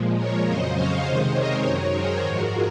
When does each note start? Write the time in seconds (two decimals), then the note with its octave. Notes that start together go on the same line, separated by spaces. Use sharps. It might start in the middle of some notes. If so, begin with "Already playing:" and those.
Already playing: A#2 F3 G#3
0.16 A#4 C#5
0.45 F2 C#3 F#3 C5 D#5
0.75 C#5 F5
1.04 C3 D#3 G#3 C5 D#5
1.33 A#4 C#5
1.63 F#2 D#3 F#3
1.92 G#4 C5
2.22 G#2 F3 G#3 F#4 A#4